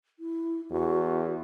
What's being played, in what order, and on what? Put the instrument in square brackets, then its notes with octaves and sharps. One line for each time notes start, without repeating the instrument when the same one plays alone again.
[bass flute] E4
[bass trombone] E2 [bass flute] F#4